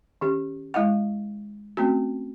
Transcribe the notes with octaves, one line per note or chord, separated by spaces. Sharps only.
D#3 C#4 G4
G#3 E4 D#5 F#5
A3 C4 C#4 F#4